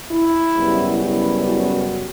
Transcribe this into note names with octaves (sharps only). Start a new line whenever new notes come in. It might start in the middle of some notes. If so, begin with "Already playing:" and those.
E4
F#2 C#3 G3 B3
E4
F#4